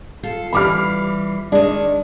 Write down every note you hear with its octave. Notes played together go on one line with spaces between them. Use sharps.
F4 A4
E3 G3 F4 B5 D6 F6
D#3 G#3 D4